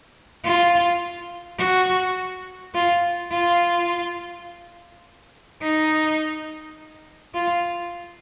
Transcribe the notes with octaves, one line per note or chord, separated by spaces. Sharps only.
F4
F#4
F4
F4
D#4
F4